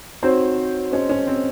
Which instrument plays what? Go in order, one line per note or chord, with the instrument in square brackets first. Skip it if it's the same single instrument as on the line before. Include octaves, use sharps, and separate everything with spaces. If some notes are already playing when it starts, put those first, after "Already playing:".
[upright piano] C4 C5 [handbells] D#4 F#4 C#5
[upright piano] C#4 [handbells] G#4 C5 D#5 A5
[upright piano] C#4
C4